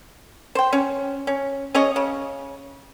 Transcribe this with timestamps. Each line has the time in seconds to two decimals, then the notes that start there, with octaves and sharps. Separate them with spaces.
0.55 C5 G5
0.73 C#4
1.27 C#4
1.74 C#4 G#4 C#5 D#5
1.96 C#3